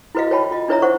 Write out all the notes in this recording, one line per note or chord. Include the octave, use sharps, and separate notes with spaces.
E4 F#4 B4 D#5 F5
B4 C#5 E5 G5 A5 B5
F4 D#5
D4 E4 B4 C#5 E5 A#5
C5 F#5 C#6